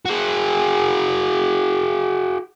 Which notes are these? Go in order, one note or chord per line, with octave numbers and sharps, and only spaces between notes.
F#4 G#4